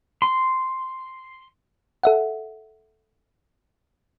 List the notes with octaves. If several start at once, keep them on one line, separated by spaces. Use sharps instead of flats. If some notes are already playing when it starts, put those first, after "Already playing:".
C6
A4 E5 F#5